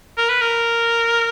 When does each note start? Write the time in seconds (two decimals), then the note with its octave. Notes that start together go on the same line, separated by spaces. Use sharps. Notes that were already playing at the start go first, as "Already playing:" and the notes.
0.17 A#4
0.29 B4
0.41 A#4